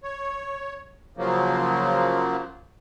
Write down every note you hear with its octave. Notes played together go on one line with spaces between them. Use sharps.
C#5
C#3 F3 F#3 A#3